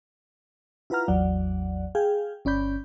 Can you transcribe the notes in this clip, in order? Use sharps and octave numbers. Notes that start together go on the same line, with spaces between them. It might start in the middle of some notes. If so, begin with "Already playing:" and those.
E4 F4 B4 F#5 A#5 F6
A1 E2 F#3 D5 F#5
G#4 F5 G5 G#5
G1 C#4 D5 B5 G6